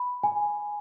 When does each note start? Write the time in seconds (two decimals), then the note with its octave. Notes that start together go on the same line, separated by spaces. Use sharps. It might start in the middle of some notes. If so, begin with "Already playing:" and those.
Already playing: B5
0.23 G#5